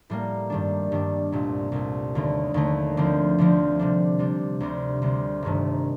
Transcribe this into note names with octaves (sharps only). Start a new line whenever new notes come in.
A2 G3 A#3
G2 D#3 G3 D4
G2 D#3 G3 D4
C2 A#2 A3
C2 A#2 A3
D#2 D3 A3
D#2 D3 A3
D2 D3 F3 C4
D2 D3 F3 C4
C3 G3 D4
C3 G3 D4
D2 C3 G3 C4
D2 C3 G3 C4
G1 G2 D#3 A3